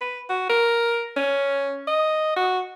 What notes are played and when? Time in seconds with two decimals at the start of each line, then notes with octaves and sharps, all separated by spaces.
0.01 B4
0.29 F#4
0.49 A#4
1.16 C#4
1.87 D#5
2.36 F#4